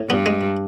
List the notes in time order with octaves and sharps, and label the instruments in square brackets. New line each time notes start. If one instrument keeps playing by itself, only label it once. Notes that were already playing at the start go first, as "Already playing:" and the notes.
Already playing: [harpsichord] A2
[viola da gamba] G2 [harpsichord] B3
[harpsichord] G#3